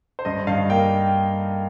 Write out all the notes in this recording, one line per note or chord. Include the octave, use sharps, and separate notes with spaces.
C5
G2 D#5
G2 F5
A#3 G5